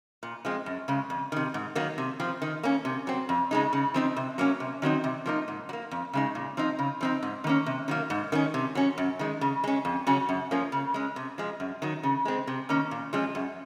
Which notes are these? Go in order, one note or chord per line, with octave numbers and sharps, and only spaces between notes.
A#2
F3 G#3 C4
F#2
C#3 G#3
F2
C3 D#3
G#2
D#3 F#3 A#3
C3
F3 C4
D#3
A#3 C#4
C3
F#3 C4
F2
C#3 G#3 D#4
C#3
F3 C4 D#4
C3
F#3 A#3 C#4
C3
D#3 F#3 C4 D#4
C3
F3 A#3 D#4
G#2
F#3
A#3
F2
C#3 G#3 D#4
A#2
F3 C4 D#4
C#3
F3 C4 D#4
G#2
D#3 A#3 C#4
C3
D#3 F#3 A#3
G#2
D#3 A#3 C#4
C3
F#3 C#4
F#2
D#3 G#3
C#3
G#3 C#4
F2
C#3 F#3 C#4
F#2
F3 A#3 C#4
C#3
G#3 C#4
C3
F3 G#3
F#2
D#3 F#3
C#3
G#3 C4
C3
D#3 A#3 C#4
A#2
F3 G#3 C#4
F#2